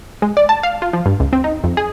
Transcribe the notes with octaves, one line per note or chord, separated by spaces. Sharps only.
G#3
D5
A5
F5
F4
F3
G2
C#2
C4
D#4
F2
G#4